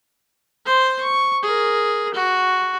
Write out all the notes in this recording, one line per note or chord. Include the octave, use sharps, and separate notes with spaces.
C5 C6
C#6
G#4 A#4
F#4